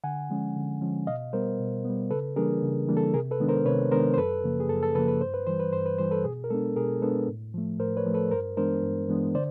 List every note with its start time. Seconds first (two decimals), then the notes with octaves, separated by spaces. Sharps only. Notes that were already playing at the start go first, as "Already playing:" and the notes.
0.04 D3 F#5 G#5
0.30 F3 G#3 C#4
0.56 D3
0.81 F3 G#3 C#4
1.07 B2 D#5 F5
1.33 G3 B3 A#4 C5
1.59 B2
1.85 G3 B3
2.11 C#3 A4 B4
2.36 E3 G3 A#3 D4 G#4 A#4
2.62 C#3
2.88 E3 G3 A#3 D4
2.97 A4
3.14 C3 G#4 A#4
3.31 A4 B4
3.40 D#3 G#3 B3 D4
3.49 A#4 C5
3.66 C3 B4 C#5
3.91 D#3 G#3 B3 D4 A#4 C5
4.14 C5
4.17 F#2 A4 B4
4.44 C#3 F3 A#3
4.60 G#4
4.69 F#2 A4
4.83 A4
4.95 C#3 F3 A#3 A4 B4
5.08 B4
5.21 G2 C5
5.34 B4
5.47 E3 G3 C5
5.60 B4
5.73 G2 C5
5.86 B4
5.98 E3 G3 C5
6.11 A4 B4
6.24 B2 G#4
6.44 A#4
6.50 G#3 B3 D4 A4
6.76 B2 G#4 A#4
7.02 G#3 B3 D4 A4 B4
7.28 A2
7.54 F3 A3
7.80 A2 A#4 C5
7.97 B4 C#5
8.06 F3 A3
8.14 A4 B4
8.31 G2 A#4 C5
8.57 E3 G#3 B3 D4 A#4 C5
8.83 G2
9.09 E3 G#3 B3 D4
9.35 D3 C5 D5